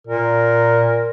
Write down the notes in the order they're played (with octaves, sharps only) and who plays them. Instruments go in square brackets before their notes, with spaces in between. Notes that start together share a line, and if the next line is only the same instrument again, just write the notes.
[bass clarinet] A#2 [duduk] A#4